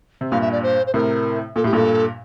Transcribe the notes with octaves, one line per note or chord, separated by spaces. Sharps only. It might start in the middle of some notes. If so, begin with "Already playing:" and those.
C3
G2 A#2 F5
E5
D5
C5
C5
A2 C3 A#4
A#2 A4
A2 G4
G2 A#2 A4